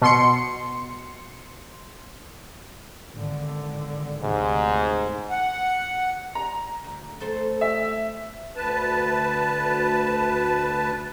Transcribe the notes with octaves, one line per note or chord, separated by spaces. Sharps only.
B2 C6 C#7
G#1 D3
D2 G#2 C3
F#5
A#5
D2
A3 A4 C5
E5
D2 B4 A5